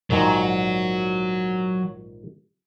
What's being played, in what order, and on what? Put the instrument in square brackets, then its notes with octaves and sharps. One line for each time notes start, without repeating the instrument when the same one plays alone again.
[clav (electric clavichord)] A#1 G#2 D#3 [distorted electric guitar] F#3